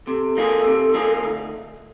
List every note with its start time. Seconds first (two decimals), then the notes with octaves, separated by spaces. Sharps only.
0.07 C3 A4
0.37 F3 A#3 D#4 G#4
0.66 C3
0.94 F3 A#3 D#4 G#4
1.23 D2